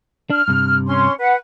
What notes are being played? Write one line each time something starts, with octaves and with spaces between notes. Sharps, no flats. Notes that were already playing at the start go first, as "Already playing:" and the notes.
D4 F6
G2 C3
C#4 C6
B4 F#5